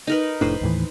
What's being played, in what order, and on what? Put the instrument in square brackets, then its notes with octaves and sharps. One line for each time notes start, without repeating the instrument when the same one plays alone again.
[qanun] D#4 A#4 B4
[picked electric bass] F1 A2 D4 [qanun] B4 C5
[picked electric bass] D#2 A2 E3